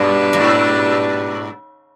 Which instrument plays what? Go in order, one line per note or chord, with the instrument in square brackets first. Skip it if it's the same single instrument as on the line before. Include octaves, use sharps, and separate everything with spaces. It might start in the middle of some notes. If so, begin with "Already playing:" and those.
Already playing: [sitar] G2 [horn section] B2 G3 D4 G4 B4
[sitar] G2
G#2